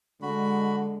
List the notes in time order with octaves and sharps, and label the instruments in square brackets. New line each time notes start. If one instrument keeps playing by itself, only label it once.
[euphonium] D3 [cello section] G#3 [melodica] F#4 B5